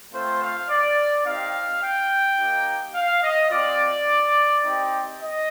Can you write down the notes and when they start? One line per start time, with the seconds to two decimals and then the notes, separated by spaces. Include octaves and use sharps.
0.13 A3 C4 F4 C5
0.41 F5
0.69 D5
1.25 C4 D#4 G4 F5
1.82 G5
2.38 A#3 D#4 G4
2.95 F5
3.22 D#5
3.51 C4 F4 D5
4.63 C4 D#4 G4
5.20 D#5